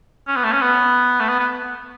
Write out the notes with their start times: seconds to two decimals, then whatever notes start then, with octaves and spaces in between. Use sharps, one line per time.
0.28 C#4
0.36 B3
0.44 A3
0.52 C#4
0.61 B3
1.20 A3
1.29 B3
1.39 B3